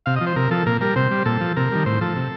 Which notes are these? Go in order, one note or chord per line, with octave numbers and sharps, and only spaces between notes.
C3 F5
D#5
F3
C5
C3 A#4
F3 A4
A#2 A#4
G3 A#4
C3 C5
G3
A#2 A4
F3
C3 A#4
D#3 G3
A2 C5
F3 A4
C3